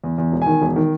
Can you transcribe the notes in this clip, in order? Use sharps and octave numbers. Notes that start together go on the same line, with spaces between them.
E2
E2
E1
D#3 G#5
E1
D#3